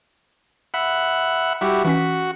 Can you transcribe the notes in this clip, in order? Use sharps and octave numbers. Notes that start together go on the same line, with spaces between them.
E5 F#5 B5
G3 E4 F#4
E3 C#4 F#4 B6